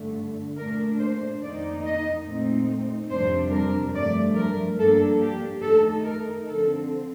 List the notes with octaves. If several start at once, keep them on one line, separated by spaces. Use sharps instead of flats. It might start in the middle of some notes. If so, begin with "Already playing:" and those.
Already playing: G2 D3 A3
A#2 A3 D4 A#4
C5
F2 D#3 A#3 D#4 D5
D#5
A#2 A3 C4 D#4
F2 C3 G3 D4 C5
A#4
G2 F3 A3 D5
A#4
G2 F3 A#3 D4 A4
G4
D#3 A3 D#4 A4
A#4
D3 F3 C4 A4